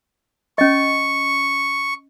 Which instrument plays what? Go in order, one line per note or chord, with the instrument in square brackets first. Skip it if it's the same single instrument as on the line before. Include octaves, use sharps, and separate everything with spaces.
[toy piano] C#4 D#5 [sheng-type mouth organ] C#6